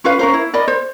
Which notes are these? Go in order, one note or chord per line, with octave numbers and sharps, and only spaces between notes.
C#4 F4 B4 F5
C#4 A#4 C5
E4
A#4 D5 D#5 B5
C5